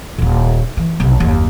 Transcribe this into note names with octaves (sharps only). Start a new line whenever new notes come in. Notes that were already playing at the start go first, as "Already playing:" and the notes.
D#1 D#2
E3
B1 C3
F#1 D#2